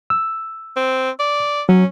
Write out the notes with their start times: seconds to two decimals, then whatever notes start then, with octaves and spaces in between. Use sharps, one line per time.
0.10 E6
0.76 C4
1.20 D5
1.69 F#3 C#4